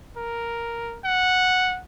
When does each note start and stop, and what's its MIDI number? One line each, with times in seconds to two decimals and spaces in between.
0.17 0.99 70
1.04 1.80 78